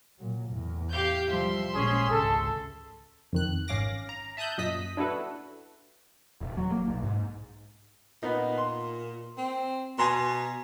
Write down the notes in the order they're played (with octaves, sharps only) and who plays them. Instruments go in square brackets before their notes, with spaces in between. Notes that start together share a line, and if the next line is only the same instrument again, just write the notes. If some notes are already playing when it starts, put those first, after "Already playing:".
[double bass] A#2 F#3
E2 A2
[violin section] G4 F5 G6
[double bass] F3 G3 [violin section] E5 C6
[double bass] A#1 G#3 [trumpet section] C#4 G#4
[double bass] G#1 C#2 [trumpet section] A4
[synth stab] F2 D#3 F#6
G#1 C#4 F5 D6 A#6
A#5
E5 A5 D#6 F#6 G6
F#2 A#2 D#5 D#6 B6
D4 E4 F#4 A4 B4
[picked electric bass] D#1
F#3
A#3
B1
G#2
[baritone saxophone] A#2 [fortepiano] B3 D#4
[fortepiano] C6
[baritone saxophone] C4
[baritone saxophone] B2 [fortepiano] G#5 A#5 C6